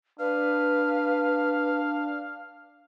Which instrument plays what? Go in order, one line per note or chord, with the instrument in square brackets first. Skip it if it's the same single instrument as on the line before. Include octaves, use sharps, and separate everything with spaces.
[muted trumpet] D4 [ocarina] B4 [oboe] F5